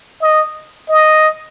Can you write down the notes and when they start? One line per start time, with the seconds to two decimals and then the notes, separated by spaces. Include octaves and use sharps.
0.22 D#5
0.89 D#5